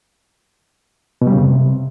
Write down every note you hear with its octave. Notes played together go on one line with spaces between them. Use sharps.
B2
G3
C#3
F#2
C3